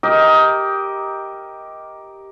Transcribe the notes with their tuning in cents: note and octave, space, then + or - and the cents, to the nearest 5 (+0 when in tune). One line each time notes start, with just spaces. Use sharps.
G4 +0 A#4 +5 D#5 +20